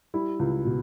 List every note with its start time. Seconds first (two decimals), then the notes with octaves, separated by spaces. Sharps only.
0.14 G3 E4
0.39 C#2
0.65 B2